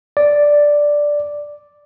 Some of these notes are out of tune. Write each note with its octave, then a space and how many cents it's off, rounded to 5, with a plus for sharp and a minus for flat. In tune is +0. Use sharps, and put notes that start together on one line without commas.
D5 +0